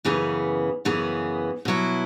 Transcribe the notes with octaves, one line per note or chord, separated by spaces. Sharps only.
F#2 C#3 E3 B3 G#4
F#2 C#3 E3 B3 G#4
B2 F#3 E4